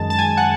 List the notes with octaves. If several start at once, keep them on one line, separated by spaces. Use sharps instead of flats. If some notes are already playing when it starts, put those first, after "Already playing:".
Already playing: F#2 D#3 G#3 A5
A5
G#5
F#5